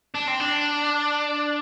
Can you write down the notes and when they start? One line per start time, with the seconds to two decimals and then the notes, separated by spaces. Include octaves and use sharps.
0.14 D4
0.27 C4
0.40 D4